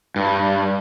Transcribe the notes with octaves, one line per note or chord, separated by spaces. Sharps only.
G2